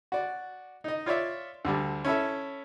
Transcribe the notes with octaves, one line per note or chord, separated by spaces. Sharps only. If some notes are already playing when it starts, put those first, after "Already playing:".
F#4 D5
D#4 D#5
F4 C#5 D5 E5
D2 D3 G3
C#4 E4 A4 E5